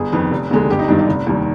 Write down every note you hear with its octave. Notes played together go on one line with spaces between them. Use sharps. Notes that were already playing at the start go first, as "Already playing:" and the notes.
Already playing: G1 G#4
F2 D#3 B3
F1
D#2 D3 G#3
G1 G4
D#4
G2 D#3 G3 D4
D#4
F1
D#2 D#3 G3